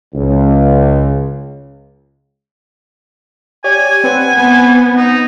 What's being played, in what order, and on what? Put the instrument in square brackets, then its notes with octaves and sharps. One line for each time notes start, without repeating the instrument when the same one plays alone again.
[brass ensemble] C#2
[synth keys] G4 C#5 D5 [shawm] G#5
[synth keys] C4 B4 F#5
[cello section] B3
[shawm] D#4